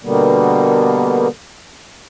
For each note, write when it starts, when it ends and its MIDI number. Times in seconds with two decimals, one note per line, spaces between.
0.03 1.28 47
0.03 1.28 50
0.03 1.28 55
0.03 1.28 58
0.03 1.28 59